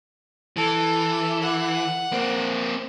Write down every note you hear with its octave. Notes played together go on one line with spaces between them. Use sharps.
E3 A4
F#5
A#3 C4